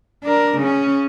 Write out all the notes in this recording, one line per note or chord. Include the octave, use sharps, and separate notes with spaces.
D4 A#4
C#3 C#4